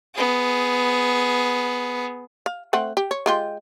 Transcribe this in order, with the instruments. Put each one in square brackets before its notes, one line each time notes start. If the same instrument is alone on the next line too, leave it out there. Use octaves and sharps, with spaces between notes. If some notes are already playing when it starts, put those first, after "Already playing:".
[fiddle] B3 G#4
[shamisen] F5
A3 C4 F#5
G4
C#5
G#3 F4 G4